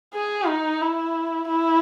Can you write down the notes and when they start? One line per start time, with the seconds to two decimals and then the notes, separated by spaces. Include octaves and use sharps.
0.14 G#4
0.47 D#4
0.81 E4
1.48 E4